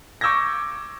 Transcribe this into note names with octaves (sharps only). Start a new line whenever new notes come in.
C#6 D6 E6 G6 G#6 A#6